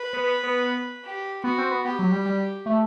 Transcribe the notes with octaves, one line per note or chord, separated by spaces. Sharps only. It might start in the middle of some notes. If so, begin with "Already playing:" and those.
Already playing: B4
B3
B3
B3
G4
B3 F#4
C4
B3
B3 G4
F#3
G3
G3
A3